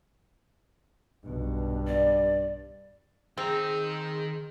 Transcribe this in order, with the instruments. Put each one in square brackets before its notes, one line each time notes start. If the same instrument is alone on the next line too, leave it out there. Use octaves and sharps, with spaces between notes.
[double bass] B1 B2 [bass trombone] G2
[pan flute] D5
[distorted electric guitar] D#3 A#5 [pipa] C4 [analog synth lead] G#4